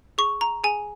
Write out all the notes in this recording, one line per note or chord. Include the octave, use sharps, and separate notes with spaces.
G#4 C#6
A#5
G#4 G#5